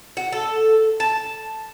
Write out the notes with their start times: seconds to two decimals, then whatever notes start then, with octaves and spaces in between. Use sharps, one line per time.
0.17 F#4
0.33 A4
1.00 A5